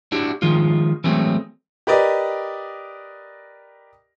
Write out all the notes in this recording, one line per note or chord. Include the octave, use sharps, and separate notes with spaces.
D4 E4 F#4 G4
D#3 F3 G#3 F4
E3 F#3 G#3 A3 C4
G4 A#4 B4 D5 D#5